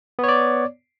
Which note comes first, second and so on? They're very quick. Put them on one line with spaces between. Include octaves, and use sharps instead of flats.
B3 C#5 D5